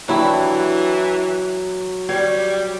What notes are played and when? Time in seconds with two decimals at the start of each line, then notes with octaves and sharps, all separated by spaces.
0.08 E3 F#3 D4 E4 G4
2.09 G3 C#5